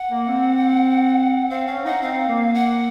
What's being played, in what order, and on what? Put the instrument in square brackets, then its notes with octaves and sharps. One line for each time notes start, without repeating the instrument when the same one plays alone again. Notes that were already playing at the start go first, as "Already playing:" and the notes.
Already playing: [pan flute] F#5
[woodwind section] A#3
C4
[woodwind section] C4 [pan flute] F5
[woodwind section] C#4 [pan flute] F5
[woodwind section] D#4 [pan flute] F#5
[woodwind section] C4 [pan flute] F5
[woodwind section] A#3
[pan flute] F#5